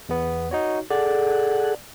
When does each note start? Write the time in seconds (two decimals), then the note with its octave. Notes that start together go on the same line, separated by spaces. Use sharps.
0.09 E2 B3
0.51 D#4 F#4 C#5
0.90 G#4 A4 D5 F#5